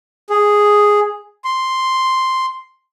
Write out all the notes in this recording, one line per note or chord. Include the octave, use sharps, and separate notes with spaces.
G#4
C6